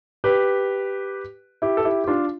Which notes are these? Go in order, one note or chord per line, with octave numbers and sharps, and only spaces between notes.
G4 B4
E4 G4
A4
E4 G4
G4
D4 F4